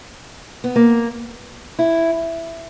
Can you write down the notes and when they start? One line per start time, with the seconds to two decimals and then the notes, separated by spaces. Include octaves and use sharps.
0.64 B3
0.76 A#3
1.79 E4